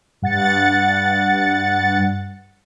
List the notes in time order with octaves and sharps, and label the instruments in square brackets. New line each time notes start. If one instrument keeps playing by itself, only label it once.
[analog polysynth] G2 F#5 A6 C#7